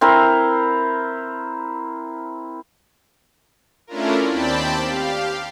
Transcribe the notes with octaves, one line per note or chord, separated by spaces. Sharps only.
C4 E4 A#4
A3 C#4 D4 E4 F4 A#4
D#2 C4 D5 G5 A5 B5
G4 F5